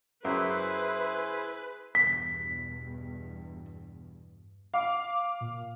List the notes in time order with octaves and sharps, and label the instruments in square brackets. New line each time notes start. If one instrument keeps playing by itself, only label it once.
[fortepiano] F#2 [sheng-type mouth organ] E4 G#4 C5 [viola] B4
[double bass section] E2 G2 B2 [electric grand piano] B6
[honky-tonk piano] F5 [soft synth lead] D6
[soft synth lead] A#2